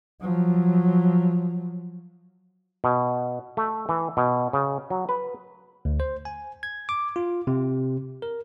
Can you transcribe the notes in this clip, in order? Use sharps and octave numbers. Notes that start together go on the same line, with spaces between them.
F3 F#3
B2
A3
E3
B2
C#3
F#3
B4
D2
C5
G#5
G#6
D6
F4
C3
A#4